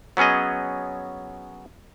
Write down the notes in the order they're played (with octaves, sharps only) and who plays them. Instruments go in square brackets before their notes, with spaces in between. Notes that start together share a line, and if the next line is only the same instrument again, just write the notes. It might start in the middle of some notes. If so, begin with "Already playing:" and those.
[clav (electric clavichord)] F#3 B3 C#4 G#4 D#5